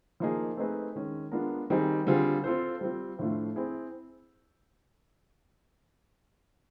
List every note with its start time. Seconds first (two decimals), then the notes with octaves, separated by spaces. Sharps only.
0.20 F3 A#3 D#4 G#4
0.57 A3 C4 D#4 G#4 B4
0.96 D#3 G#3 C#4
1.32 G#3 B3 D4 F4 A#4
1.70 D#3 G3 C4 D#4 G#4
2.07 D3 G3 C4 F4 G#4
2.44 C4 F4 A4 C5
2.81 G3 C4 F4
3.19 A2 F3 A3 D4 F4
3.56 C4 E4 G#4